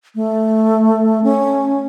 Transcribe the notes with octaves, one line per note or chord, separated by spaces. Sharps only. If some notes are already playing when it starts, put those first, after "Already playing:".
A3
C#4